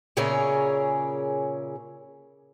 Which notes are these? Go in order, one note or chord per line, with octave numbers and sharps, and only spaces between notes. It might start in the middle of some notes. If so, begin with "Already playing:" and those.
A#2 C#3 C#4 G#4 A#4 E5